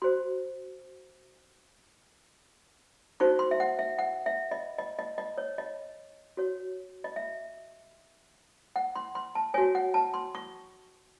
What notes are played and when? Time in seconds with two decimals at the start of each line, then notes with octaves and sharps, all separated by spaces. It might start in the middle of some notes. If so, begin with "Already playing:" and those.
0.02 F#4 C5 C6
3.20 D#4 F#4 C5 C#6
3.39 C6
3.51 E5
3.60 F#5
3.79 E5
3.99 F#5
4.26 E5
4.51 D#5
4.79 D#5
4.99 D#5
5.18 D#5
5.38 C#5
5.58 D#5
6.37 F#4 C#5
7.04 D#5
7.16 E5
8.76 F#5
8.95 C6
9.15 C6
9.35 A5
9.54 F#4 C#5 G#5
9.75 F#5
9.94 A5
10.14 C6
10.35 C#6